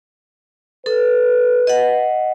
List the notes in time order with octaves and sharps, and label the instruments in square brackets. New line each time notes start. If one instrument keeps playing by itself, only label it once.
[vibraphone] A4 [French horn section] B4
[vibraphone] D#5 F#5